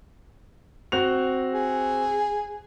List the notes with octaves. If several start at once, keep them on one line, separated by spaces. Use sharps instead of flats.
C4 F#4 F7
G#4